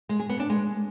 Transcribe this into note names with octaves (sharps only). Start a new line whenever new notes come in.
G#3
G#4
B3
D4
G#3